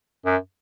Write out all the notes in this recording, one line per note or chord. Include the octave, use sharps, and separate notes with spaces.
F#2